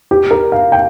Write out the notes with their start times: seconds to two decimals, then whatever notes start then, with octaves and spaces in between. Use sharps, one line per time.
0.11 G4
0.31 A#4
0.52 F5
0.72 G5